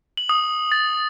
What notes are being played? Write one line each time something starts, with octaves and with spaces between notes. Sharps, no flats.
F#7
D#6
A6